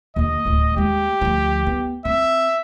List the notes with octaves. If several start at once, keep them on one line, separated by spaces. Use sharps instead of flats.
D#2 D3 D#5
D1 D2
D#2 G#3 G4
D2 F3
B3
C4 E5